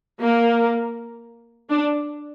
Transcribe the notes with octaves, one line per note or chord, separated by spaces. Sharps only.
A#3
D4